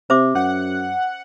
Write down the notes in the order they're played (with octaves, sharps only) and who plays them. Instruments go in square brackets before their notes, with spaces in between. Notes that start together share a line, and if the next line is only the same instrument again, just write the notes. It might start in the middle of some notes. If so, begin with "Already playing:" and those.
[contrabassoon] C3 [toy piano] C5 E5 D6
[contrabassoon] F#2 [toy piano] C#4 [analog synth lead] F#5